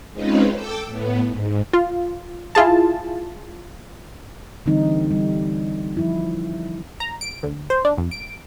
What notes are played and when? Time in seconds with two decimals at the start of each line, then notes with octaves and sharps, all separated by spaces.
0.13 G#3 C4 C#4 D#4 F4 B4
0.53 A4 G5 D6 E6
0.86 A2 B3
1.27 G#2
1.73 F4
2.55 E4 F4 G#4 A5
4.66 D3 E3 G3 C4 D#4
5.11 G3
5.97 F3 E4
7.00 A#5
7.21 D7
7.43 D2
7.70 C5
7.85 D4
7.97 F2
8.11 D7